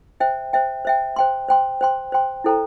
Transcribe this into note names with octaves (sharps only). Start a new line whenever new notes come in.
C5 E5 G5
C5 E5 G5
C5 E5 G5
C5 G5 C6
C5 G5 C6
C5 G5 C6
C5 G5 C6
E4 A4 C5 G5 A#5